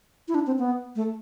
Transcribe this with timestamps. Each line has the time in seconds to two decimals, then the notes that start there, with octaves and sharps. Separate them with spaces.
0.28 E4
0.35 D4
0.47 C4
0.59 B3
0.96 A3